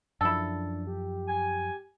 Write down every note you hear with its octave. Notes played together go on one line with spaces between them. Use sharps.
F#2 F3 D4 E4 A4
G4
G#5